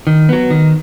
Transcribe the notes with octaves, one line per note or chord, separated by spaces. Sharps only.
D#3
F#3 B3
D#3